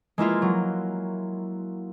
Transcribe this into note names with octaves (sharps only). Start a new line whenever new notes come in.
G#3 A#3 E4 F4
F#3